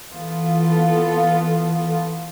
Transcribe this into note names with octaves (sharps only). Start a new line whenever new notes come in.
E3 B3 F4 A4